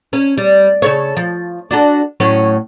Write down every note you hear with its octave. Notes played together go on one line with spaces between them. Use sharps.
C#4
G3
C#3 A4 C#5
F3
D4 F#4 A4
A2 F#3 C#4